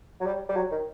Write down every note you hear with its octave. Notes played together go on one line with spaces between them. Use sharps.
F#3
G3
G3
F#3
D#3